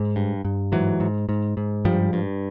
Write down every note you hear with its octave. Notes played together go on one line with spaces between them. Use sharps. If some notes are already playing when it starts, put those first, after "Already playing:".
Already playing: G#2
G2
G2
G#2 E3 F#3
G#2
G#2
G#2
G2 F3 G3
G2